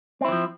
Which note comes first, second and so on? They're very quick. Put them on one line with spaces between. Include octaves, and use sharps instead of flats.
C4 E4 E3 F3